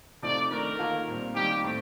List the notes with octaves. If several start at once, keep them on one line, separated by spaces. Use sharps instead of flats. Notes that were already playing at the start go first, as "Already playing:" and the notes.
C3 F3 A3 D#4 D5
D#3 A3 D4 A#4
D#3 A#3 F4 A4
A#2 G3 C4
D#3 G3 A#3 G4
A2 A3 C4